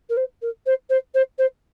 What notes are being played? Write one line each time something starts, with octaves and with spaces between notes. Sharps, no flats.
A#4
C5
A#4
C5
C5
C5
C5